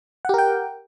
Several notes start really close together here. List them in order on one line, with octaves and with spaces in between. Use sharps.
F#5 G4 A#4 G5